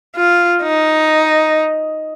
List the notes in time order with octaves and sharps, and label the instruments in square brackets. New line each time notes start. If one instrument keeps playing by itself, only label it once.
[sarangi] F4
D#4